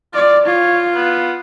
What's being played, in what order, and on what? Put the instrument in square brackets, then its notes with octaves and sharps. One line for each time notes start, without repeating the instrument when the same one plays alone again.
[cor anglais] F4 [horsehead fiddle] D5
[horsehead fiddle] F4 [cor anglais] C#5
[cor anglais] B3